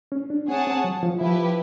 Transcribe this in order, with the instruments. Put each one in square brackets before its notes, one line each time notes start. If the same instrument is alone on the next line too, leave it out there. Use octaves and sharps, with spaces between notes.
[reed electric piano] C#4
D4
[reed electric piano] C4 [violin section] G#4 C#5 F#5 A5
[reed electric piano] C4
F#3
F3
[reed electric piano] F3 [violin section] E4 G4 B4